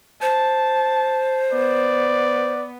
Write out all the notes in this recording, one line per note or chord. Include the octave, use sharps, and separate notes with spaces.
C5 A5
B3 D5